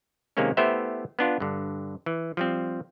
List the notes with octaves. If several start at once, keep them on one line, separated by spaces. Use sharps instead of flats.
C3 D#3 G#3 A#3 C4 C#4
A3 B3 E4 G4 C5 E5
B3 D4 F4
G2 D3
E3
F3 G3 C4